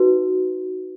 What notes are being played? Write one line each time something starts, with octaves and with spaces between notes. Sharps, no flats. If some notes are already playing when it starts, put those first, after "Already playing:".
Already playing: D#4 F#4 B4